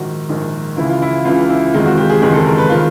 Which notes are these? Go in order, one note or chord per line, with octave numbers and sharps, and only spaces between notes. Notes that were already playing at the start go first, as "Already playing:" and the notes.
Already playing: A#1 G#2 D#3 F#4
A#1 G#2 D#3
C#2 C#3 E3 E4
F4
E4
C#2 C#3 E3 F4
E4
F#1 E2 C3 D#3 G#3 F4
F#4
G4
G#4
F#1 E2 C3 D#3 G#3 G#4
A4
A#4
B4
D#3 G#3 C4 F4